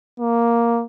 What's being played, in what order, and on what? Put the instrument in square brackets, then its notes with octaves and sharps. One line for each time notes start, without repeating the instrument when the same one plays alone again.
[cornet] A#3